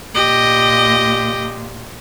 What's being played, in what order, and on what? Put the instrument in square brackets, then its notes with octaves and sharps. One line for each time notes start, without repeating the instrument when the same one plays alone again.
[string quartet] A#2 [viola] G4 D#5